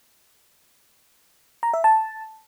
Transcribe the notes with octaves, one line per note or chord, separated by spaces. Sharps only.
A#5
E5
A5